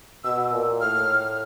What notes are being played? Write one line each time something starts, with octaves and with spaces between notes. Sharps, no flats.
B2 E6
A#2
A2 F6